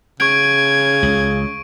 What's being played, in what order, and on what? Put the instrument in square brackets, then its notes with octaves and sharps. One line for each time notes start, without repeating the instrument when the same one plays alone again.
[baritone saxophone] C#3 [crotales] C#6 D7 [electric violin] G#6
[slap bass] C#2